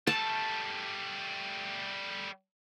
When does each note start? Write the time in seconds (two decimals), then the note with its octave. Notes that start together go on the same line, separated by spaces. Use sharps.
0.07 G3 A3 A5